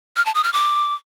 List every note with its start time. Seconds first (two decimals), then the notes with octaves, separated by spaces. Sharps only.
0.16 F6
0.25 A5
0.34 D#6
0.44 F6
0.53 D6